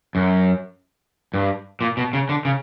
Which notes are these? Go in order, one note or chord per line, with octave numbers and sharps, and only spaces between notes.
F#2
G2
A#2
B2
C#3
D3
C#3